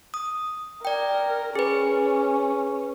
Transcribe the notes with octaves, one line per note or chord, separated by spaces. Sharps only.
D#6
A#4 D5 G5
C#4 G#4 B4